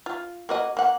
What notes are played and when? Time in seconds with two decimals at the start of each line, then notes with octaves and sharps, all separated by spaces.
0.06 F4
0.49 A#3 F#4 D#5
0.77 A#3 F#5